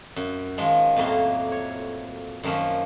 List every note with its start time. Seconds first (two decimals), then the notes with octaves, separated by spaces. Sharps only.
0.16 F#2
0.58 D#3 F3 G#3
0.96 F2 A2 F#3 A#3 C6
1.52 C#5
2.43 F#2 D#3 F3 A#3 C#4